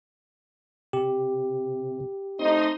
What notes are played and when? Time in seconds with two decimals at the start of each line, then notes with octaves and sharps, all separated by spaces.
0.93 C3 G4
2.39 A3 C4 D#4 D#5 C6 D#6